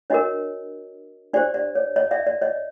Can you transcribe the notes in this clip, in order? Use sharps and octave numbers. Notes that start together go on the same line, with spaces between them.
D4 F#4 A#4 C#5 D#5
D4 G4 C5 D5
D5
C#5
C#5 D#5
D5 E5
D5
C#5 D#5